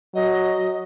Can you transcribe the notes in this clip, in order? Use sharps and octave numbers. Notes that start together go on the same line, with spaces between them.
F#3 D#5